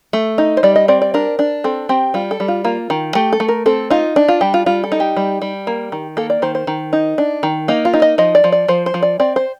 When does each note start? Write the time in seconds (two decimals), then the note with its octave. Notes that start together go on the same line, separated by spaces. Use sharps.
0.13 A3
0.38 D#4
0.57 C5
0.63 G3 D5
0.76 D#5
0.88 C4 D5
1.02 D5
1.14 D4 A#4
1.39 D4
1.64 C4 A4
1.89 C4 G4
2.14 G3 F4
2.31 A4
2.40 G3
2.48 F4
2.64 A#3 F4
2.90 D#3
3.15 A3 G4
3.33 A4
3.40 A3
3.48 A#4
3.66 C4 A4
3.90 D#4 F4
4.16 D4
4.28 F4
4.41 G3 G4
4.54 F4
4.66 G3 F4
4.84 A4
4.92 D#4
5.00 G4
5.16 G3
5.42 G3
5.67 A#3
5.92 D#3
6.17 A#3 A4
6.30 D5
6.42 D#3 C5
6.55 C5
6.67 D#3
6.93 D#4
7.18 D4
7.43 D#3
7.68 A#3 D#4
7.85 F4
7.93 D#4
8.02 D#5
8.18 F3 D#5
8.35 D5
8.44 F3
8.52 D5
8.68 F3 C5
8.86 C5
8.94 F3
9.03 D5
9.20 C4 D5
9.36 C5